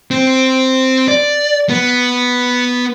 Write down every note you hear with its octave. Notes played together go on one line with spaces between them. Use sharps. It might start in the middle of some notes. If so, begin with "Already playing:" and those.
C4
D5
B3